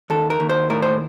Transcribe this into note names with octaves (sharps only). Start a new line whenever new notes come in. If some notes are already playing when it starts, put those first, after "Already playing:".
D#2 A4
A#4
D#2
C5
A2 A#4
C5